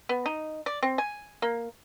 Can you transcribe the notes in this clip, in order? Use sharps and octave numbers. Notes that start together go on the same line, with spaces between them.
B3
D#4
D5
C4
G#5
A#3